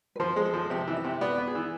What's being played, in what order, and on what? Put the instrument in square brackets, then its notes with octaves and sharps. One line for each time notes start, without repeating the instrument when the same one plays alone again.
[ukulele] B4
[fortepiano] F3 [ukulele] C5
[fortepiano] G#3
[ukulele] A4
[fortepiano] F3
[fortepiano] C3 [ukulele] E5
[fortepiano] E3
[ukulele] E5
[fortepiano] C3
[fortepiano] B3 [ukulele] D5
[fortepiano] B3
[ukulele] G#4
[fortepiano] E3